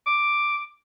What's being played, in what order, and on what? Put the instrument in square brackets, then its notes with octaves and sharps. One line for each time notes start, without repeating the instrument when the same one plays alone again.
[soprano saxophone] D6